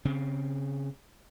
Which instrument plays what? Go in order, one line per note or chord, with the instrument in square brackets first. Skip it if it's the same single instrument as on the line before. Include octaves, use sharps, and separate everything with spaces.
[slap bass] C#3 C4